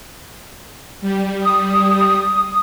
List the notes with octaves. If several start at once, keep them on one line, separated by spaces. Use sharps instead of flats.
G3
D#6